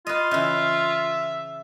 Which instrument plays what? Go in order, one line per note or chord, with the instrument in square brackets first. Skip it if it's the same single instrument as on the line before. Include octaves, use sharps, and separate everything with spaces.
[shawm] F4 [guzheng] B4 D#5
[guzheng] C#3 E3 [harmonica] E5